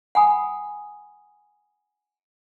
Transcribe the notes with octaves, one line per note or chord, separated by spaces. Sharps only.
F#5 G#5 B5 D#6